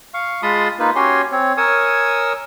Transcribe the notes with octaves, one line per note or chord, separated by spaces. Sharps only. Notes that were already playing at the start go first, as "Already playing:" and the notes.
F5 C#6
G#3 F4 A5 B5 C6 D#6
A#3 D#4 F4 B4
C#4 F#4 G4 C#5 G#5 C6
C4 C#5
A#4 C#5 G#5 C#6 D#6 E6